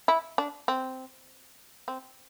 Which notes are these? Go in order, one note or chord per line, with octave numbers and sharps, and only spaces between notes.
E4
D4
C4
C4